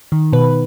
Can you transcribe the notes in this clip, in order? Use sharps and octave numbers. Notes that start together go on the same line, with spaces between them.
D#3
B2 B4